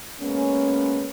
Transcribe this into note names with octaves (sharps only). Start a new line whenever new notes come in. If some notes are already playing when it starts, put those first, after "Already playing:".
G#3 A#3 B3 C#4